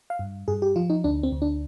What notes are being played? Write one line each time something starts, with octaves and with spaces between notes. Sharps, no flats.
F5
G2
G2 G#4
G4
F3 F4
D#4
D2 D4
C4
D2
D4